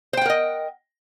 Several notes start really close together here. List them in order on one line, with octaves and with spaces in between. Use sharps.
C5 G5 F#5 A#4 D#5